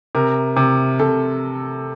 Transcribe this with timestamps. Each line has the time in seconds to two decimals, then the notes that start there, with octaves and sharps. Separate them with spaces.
0.15 C3 A#4
0.56 C3
1.00 C3 A4